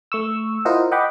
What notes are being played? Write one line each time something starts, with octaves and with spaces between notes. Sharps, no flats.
A3 C#6 E6
E4 F4 A#4 C5 D#5 F#5
D#5 F#5 G5 B5 D6